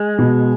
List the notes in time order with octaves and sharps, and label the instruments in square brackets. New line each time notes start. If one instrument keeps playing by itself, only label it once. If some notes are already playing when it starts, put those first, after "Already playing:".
Already playing: [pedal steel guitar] G#3
[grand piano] B2